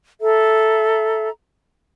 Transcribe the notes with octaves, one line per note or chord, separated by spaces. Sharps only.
A4 E5 A#5